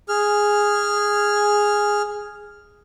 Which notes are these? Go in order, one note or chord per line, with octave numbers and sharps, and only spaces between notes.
G#4 F6